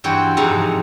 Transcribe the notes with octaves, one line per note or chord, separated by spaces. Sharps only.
G2 E3 C4 F#4 G5
F2 G#2 C3 E3 A#5